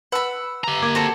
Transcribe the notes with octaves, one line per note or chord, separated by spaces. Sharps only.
B4 F#5 B5 E6
G4 A#5
A#3 D6 G#6
C4 F#4 A4